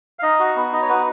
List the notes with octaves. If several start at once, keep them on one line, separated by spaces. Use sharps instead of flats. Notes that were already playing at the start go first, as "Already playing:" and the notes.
F5
D#4 D#5
F#4
B3
D#4 D#5
C#5
F#4 B4